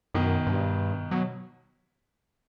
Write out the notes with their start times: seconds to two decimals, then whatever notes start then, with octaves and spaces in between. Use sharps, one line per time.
0.14 F#2 B2 D#3
0.47 G2
1.11 B2 F#3